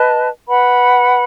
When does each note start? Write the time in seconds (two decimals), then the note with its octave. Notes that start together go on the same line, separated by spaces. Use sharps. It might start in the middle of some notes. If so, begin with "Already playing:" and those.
Already playing: B4 D#5 A5
0.49 B4 F#5 B5